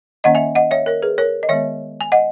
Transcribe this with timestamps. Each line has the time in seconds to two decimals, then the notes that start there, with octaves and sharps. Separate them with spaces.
0.24 D#3 A#3 C#4 D#5 F#5
0.35 E5 G#5
0.55 D#5 F#5
0.71 C#5 E5
0.86 A#4 C#5
1.02 G#4 B4
1.18 A#4 C#5
1.43 D#5
1.49 D#3 G#3 B3 C#5 E5
2.01 G#5
2.12 D#5 F#5